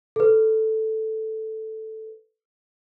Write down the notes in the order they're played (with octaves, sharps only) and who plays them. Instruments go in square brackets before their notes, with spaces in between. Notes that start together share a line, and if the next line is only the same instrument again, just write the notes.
[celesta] A4 B4